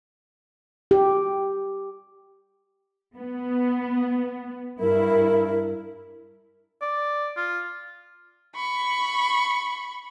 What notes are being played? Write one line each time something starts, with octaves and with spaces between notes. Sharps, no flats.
G4
B3
G2 E4 A#4
D5
F4
B5 C#6